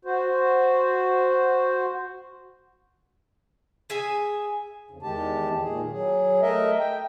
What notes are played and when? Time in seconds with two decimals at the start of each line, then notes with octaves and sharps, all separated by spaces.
0.05 F#4 C5
3.90 G#4 E5 G#5
4.91 F2 C#3
5.02 E2 D#3 G#3 G4 A5
5.62 A#2 D#3 G#4
5.91 F#3 G#4
6.42 A3 A#4 D#5 E5
6.79 G5